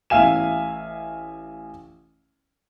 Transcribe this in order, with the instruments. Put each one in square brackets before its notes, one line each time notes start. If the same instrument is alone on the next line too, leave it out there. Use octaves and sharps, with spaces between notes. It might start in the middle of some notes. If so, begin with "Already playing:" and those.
[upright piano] A1 E5 F5 G#5 E7